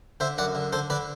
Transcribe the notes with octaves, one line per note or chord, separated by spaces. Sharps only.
D3 C5 E5
F#2 D5 F#5
D3
D3 A4 C5
D3 B4 D5